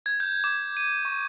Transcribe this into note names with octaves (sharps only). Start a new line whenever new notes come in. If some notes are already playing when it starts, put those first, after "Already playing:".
G#6
G6
D6
D#7
C#6